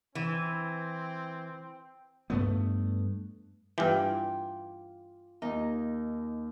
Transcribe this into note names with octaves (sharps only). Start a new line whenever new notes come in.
E3 C4
G2 A3 B3
G2 E3 F4 G5 G#5 D6
D#2 D#4